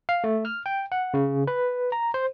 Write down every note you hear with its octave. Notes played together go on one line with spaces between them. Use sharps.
F5
A3
F6
G5
F#5
C#3
B4
A#5
C5